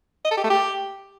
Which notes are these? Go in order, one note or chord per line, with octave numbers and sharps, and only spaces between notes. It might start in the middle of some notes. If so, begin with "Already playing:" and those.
D#5
A4
G4
A3
G4